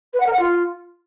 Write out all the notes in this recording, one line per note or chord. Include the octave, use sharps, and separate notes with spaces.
B4
F#5
A#4
F#5
F4